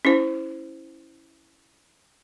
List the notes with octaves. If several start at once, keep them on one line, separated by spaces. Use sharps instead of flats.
C#4 E4 C5